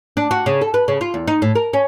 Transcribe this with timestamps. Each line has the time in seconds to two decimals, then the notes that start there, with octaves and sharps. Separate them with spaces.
0.17 D4
0.31 F#4
0.46 C#3
0.61 A4
0.74 B4
0.88 C#3
1.01 F4
1.14 E2
1.28 D#4
1.42 A2
1.55 A#4
1.73 C#4